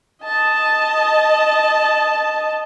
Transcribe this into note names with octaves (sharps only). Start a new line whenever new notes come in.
D#5 A5